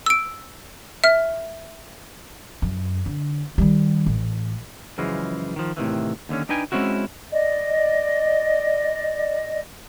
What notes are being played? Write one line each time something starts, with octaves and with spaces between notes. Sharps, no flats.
E6 D7
E5 F6
F#2
D3
D#3 G3
A1
F#2 C#3 E3 F3 G#3
D#3 F3
A2 C3 D#3 E3
D#2 D3 C#4
D4 D#4 B4 G5 G#5
G#3 C4 C#4 E4 F#4
D5 D#5